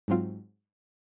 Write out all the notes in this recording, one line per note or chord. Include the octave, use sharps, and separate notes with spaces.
G#2 F#3 C4 F4